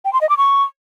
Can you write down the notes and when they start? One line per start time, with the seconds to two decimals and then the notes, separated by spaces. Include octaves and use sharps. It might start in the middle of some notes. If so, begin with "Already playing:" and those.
0.05 G5
0.13 C6
0.21 D#5
0.29 D6
0.37 C#6